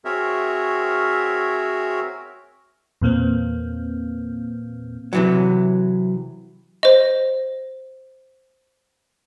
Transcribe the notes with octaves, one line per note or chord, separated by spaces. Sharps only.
C4 F#4 G#4 A#4 C#5 E5
E2 A#2 A#3 C4
C3 E3 F#3
C5 D#5